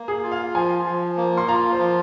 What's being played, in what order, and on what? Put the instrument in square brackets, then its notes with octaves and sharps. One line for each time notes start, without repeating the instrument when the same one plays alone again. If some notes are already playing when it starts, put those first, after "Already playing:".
Already playing: [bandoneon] A#3
[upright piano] G#4
[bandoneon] F4
[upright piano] F5
[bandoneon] F3 [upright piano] G#5
[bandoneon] F3
A#3
[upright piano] C6
[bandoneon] F4 [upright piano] A#5
[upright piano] C5
[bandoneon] F3